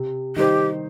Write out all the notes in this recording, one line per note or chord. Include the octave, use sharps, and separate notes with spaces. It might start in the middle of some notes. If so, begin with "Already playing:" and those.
Already playing: C3
D#3 G3 D#4 G4 C5